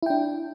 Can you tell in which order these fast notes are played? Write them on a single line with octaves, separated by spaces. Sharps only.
E4 G5 D4